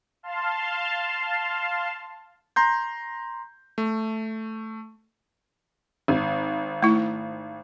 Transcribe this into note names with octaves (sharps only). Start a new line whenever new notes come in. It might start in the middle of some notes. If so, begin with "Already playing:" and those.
F5 A5 C6
A#5 C6 G6
A3
G#1
A3 E4